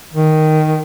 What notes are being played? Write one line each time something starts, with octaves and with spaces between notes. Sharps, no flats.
D#3